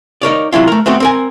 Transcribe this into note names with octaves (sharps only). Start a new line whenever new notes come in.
D#4 A#4 C#5 D5
C3 F#3 E4 F4
A3 A#4
A3 B3 C4 F#4
C4 A#4 G#5